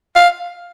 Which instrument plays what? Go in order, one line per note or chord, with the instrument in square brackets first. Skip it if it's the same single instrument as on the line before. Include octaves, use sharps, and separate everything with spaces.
[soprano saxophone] F5